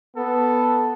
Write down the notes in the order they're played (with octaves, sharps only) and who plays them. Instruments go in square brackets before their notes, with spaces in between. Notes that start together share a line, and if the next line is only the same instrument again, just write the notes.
[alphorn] B3 [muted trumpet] A4